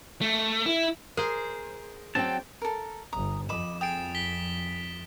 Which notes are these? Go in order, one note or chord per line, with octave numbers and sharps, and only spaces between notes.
A3
E4
G#4 A#4 C5
F#3 C4 D5 G5 A5
A4 A#4
G1 A#5 D#6
F2 D#5 B5 D6 E7
G#4 G5 D#6 A6 D7
B6 G7